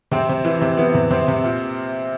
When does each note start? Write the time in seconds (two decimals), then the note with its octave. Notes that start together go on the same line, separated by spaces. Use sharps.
0.12 C3 C4
0.29 C3
0.45 E3
0.61 C3
0.77 E3 B3
0.95 C3
1.10 C3 C4
1.28 C3
1.44 A#2